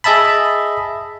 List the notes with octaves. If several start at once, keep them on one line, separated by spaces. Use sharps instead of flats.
G#4 D#5 E5 A5 B5